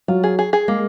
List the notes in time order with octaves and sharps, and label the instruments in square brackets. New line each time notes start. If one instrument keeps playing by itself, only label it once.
[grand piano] F#3 [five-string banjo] F4
[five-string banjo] G#4
G#4
G#4
[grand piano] G#3 [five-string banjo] A#3